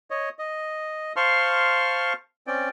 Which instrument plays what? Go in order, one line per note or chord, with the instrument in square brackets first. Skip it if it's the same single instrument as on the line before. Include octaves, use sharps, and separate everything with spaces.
[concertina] C#5 D#5
D#5
C5 F5 A5 C6 C#6 F6
C4 C#4 D5 G5